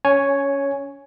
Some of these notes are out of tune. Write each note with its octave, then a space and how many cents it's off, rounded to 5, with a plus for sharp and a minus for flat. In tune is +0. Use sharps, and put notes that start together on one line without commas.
C#4 +20 C#5 +0 G#5 +0